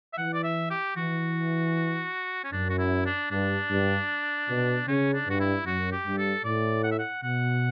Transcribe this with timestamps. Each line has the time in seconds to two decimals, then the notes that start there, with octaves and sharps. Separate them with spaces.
0.13 E5
0.18 E3 F#5
0.33 D5
0.44 E5
0.70 G4
0.96 E3 F#4
2.44 C#4
2.52 F#2 D4
2.69 F#4
2.79 E4
3.05 D4
3.31 G2 D4
3.70 G2
4.49 B2
4.88 C#3 C#4
5.13 D4
5.27 G2 F#4
5.40 E4
5.66 F#2 F#4
5.92 G4
6.06 G2
6.18 A4
6.44 A2 D5
6.83 F#5
6.91 E5
6.99 F#5
7.23 B2 F#5